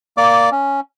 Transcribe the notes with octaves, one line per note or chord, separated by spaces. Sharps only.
A#3 D5 D6
C#4